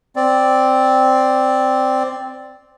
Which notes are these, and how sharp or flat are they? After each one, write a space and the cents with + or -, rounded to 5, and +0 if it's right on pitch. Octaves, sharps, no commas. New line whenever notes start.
C4 +0 D5 +0